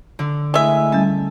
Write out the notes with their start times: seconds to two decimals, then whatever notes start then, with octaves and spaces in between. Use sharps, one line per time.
0.19 D3
0.54 G#3 A3 E4 E5 G#5
0.92 G3 C#4 A5